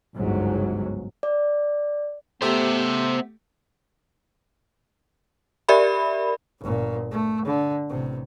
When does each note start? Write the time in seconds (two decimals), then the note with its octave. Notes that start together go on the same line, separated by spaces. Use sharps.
0.15 G1 C#2 G#2 F#3
1.23 D5
2.42 A3 B3 G4 C5 E5
5.69 G4 A#4 D5 E5 B5
6.61 G1 A#2
7.11 A3
7.45 D3
7.89 A1 C3